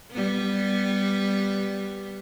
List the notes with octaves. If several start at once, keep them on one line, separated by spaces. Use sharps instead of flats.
G3 B3